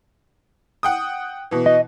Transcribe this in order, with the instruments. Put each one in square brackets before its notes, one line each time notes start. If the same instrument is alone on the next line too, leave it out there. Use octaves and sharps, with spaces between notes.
[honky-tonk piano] F#5 G5 D#6
B2 E3
[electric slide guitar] D#5